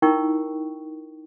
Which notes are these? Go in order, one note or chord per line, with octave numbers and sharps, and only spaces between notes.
D#4 E4 A#4 G5 C#6